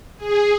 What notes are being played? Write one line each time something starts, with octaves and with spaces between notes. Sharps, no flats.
G#4